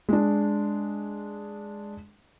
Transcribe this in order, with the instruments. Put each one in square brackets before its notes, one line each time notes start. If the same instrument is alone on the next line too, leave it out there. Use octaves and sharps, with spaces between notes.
[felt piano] G#3 D4